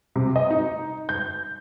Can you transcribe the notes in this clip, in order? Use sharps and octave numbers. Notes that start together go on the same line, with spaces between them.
C3
D#5
D#4
G6